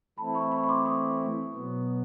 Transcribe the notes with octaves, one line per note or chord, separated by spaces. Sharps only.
E3 A3 C4 E4 A5 B5
B5 C#6
B5 C#6
C#6
C6 D6
C#6 D#6
B2 F#3 B3